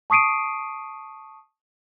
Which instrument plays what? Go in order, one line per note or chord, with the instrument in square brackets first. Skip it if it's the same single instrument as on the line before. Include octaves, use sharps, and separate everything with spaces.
[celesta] A5 C#6 D#6 C7 D7 D#7